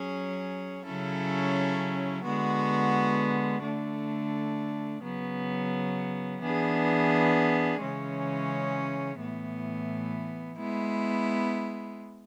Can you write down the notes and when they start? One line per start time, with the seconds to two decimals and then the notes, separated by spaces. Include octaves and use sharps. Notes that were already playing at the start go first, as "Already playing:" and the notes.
Already playing: F#3 C#4 G#4 C#5
0.85 C#3 F#3 C#4 E4 A4
2.24 D3 G#3 B3 F#4
3.63 D3 A3 D4
5.02 C#3 F#3 B3
6.41 E3 B3 D4 G#4
7.80 C#3 E3 G#3 C#4
9.19 A2 E3 B3
10.58 G#3 B3 E4